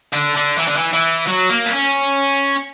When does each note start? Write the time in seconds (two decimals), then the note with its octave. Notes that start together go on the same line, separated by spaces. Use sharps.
0.13 D3
0.37 D3
0.59 E3
0.68 D3
0.77 E3
0.93 E3
1.27 F#3
1.50 A#3
1.66 B3
1.73 C#4